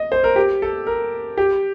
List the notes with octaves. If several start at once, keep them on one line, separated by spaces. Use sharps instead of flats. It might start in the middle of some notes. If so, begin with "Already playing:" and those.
Already playing: D#5
C5
A#4
G4
A4
A#4
G4